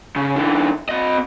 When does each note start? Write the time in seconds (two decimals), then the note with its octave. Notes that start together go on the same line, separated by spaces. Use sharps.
0.16 C#3
0.36 D3 E3
0.89 C4 D#5